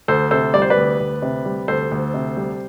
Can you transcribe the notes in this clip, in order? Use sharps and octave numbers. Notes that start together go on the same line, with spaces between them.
D2 A4 C5
C3 A4 C5
G3 D5
C5
B4 D5
D2
D2
C3
G3
D2 A4 C5
D2
C3
G3